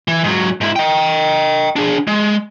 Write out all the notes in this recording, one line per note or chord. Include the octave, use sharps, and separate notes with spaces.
E3
G#2 F#3
G#2 E4
D#5 G5
D4 G#4
G#3